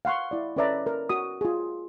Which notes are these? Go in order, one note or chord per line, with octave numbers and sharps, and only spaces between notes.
F5 F#5 C6 C#6
E4 D5
C#4 A4 B4 D5 E5 A#5
A#4
F#4 D#6
F4 G#4